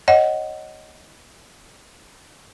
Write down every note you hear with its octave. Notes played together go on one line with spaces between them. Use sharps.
C#5 D#5 F#5